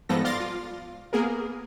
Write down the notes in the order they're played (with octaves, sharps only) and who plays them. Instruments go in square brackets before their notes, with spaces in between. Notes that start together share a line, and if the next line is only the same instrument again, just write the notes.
[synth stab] G#2 F3 G3 B3 A4 A#6
D5 F5 C6 D6 A6 A#6
F4
A#3 B3 G#4 A#4